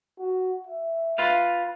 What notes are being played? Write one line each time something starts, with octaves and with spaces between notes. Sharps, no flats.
F#4
E5
F4 B4 F5